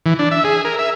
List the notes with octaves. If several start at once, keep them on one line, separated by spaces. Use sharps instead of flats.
E3
D4
E5
G#4
A#4
E5